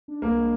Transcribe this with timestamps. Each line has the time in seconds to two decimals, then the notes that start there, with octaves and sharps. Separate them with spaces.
0.08 D4
0.22 C2 A#3
0.37 G#3